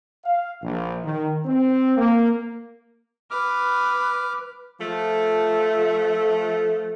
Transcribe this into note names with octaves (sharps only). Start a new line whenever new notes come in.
F5
A#1
D#3
C4
A#3
B4 D6 F6
F3 A3